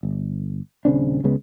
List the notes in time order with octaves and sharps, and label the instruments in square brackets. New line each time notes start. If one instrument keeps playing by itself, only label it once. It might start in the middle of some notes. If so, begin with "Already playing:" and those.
[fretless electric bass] G1
D#1 C#3 C4 D4
C#2 C#3 G#3 B3